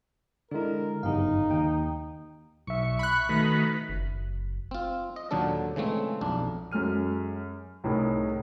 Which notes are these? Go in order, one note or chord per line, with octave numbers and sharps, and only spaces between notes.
D3 G#3 D4 E4 A#4
G1 F#2 C#3 D#4 G4 F5
D#2 G5
B1 E5 C#6
B5 F#6
D#3 A3 F#4 B4
F#1
C4 F4
D#5
D#2 A#2 D3 F#3 D4 A4
C#3 E3 G#3 A3 C4
B1 F2 D4
F#2 G#3 A4 F6 D#7
C2 A2 D#4 G#4 A#4